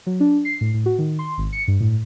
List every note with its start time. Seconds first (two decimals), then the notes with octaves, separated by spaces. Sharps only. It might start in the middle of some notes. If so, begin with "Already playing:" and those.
0.07 F#3
0.20 D4
0.45 C7
0.61 A2
0.74 A2
0.86 F#4
0.98 D#3
1.19 C6
1.38 G#1
1.53 C#7
1.68 G2
1.80 A2